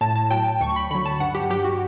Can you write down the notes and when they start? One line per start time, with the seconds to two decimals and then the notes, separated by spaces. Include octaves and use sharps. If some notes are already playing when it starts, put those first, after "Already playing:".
0.01 A2 A5
0.16 A5
0.30 F#3 G5
0.61 D2 C#6
0.76 B5
0.91 D3 F#3 B5
1.05 A5
1.20 G2 F#5
1.35 G4
1.50 F#3 G4
1.64 F#4